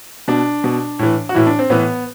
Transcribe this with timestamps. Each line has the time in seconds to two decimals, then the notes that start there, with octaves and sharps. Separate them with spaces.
0.28 B2 D4
0.64 B2
0.99 A2 E3
1.29 F#4
1.34 A2 E3 E4
1.47 D4
1.59 C4
1.70 A2 E3 B3